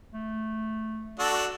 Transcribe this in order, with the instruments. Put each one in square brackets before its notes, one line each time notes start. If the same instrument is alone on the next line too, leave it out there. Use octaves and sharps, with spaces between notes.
[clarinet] A3
[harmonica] D4 F#4 A4